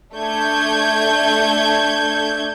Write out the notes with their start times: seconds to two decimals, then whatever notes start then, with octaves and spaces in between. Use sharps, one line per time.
0.14 A3 D4 G6 G#6